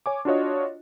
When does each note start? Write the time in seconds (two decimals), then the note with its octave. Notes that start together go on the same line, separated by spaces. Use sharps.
0.06 C#5 G#5 D6
0.25 D4 F4 F#4 C#5 D#5